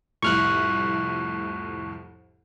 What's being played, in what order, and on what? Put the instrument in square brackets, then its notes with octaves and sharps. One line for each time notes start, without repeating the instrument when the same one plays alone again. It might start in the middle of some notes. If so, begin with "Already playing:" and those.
[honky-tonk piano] C2 F2 A2 [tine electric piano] C#6 F6 F#6